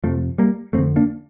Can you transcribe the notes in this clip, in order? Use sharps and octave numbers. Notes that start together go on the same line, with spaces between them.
F2 C3 F3 A3
G3 A#3
F2 D3 A3 C4
A#3 D4